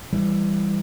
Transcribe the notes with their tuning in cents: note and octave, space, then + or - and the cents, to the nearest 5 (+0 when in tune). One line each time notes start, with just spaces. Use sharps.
E3 +20 G3 +15